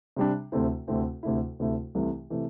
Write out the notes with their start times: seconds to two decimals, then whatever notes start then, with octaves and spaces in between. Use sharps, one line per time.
0.16 C3 G3 D4
0.52 D2 C3 A3 C4 E4
0.87 D2 C3 A3 C4 E4
1.23 D2 C3 A3 E4
1.60 D2 C3 A3 E4
1.95 C2 C3 E3 A3
2.30 C3 E3 A3